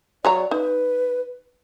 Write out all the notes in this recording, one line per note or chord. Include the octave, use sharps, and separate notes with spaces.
F#3 C#5 D5 A#5
D#4 B4